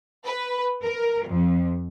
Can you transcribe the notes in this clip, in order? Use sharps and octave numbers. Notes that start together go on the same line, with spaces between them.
B4
A#4
F2